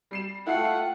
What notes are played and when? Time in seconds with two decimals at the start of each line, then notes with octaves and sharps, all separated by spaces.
0.11 G3 C7 E7
0.47 A3 E4 F4 F#5 G5 C7